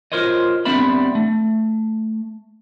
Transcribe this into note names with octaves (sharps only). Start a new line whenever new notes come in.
F4 G4 A#4 C5 C#5 D#5
G3 B3 C4 D4 E5 B5
A3